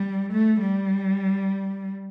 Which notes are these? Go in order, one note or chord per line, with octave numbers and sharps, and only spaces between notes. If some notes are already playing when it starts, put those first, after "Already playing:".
Already playing: G3
A3
G3